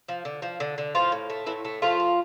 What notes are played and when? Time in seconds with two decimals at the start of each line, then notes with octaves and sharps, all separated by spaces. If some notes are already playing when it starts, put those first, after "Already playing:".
0.08 F3
0.25 D3
0.42 F3
0.60 D3
0.78 D3
0.95 A2 F3 F4
1.12 A2
1.30 A3
1.46 A2 E3 E4
1.65 A3
1.82 F3 A3 F4
2.00 A3